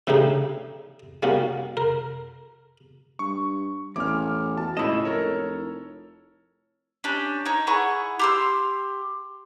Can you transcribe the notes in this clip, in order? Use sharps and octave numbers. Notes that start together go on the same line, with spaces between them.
A2 C#3 E3 D4 D#4 G4
G3 A#3 C#4 D#4 F#4
A#4
G2 C#6
A1 E2 D6 F6
B2 A5
C#2 A2 E4 D#5 E7
F1 A4 A#4 C#5
C#4 D4 G4
D#4 C#5
E4 G#4 F#5 C#6
G4 C6 E6